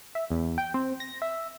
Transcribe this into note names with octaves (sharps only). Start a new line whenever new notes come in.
E5
E2
G5
C4
A#6
E5